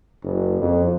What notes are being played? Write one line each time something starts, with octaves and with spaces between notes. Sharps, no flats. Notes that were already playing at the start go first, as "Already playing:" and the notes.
F#1
F2